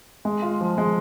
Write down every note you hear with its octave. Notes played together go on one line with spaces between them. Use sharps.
G#3
F4
F3
G#3